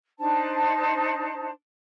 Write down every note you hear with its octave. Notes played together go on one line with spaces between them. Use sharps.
D4 D#4 C5 A5